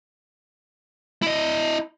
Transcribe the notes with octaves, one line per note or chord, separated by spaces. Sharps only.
E4 D#5